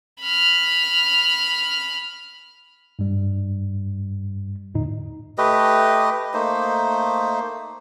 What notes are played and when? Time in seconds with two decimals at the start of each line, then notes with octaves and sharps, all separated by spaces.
0.21 B5 F6
2.99 G2 G3
4.74 E2 A2 D3 D#4
5.38 A3 G4 B4 D#5
6.34 A3 A#3 D#4 C5